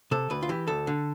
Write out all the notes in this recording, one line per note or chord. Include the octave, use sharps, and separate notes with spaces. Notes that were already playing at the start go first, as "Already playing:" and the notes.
C3 A4
D2 B4
F4
E3 G4
D2 A4
D3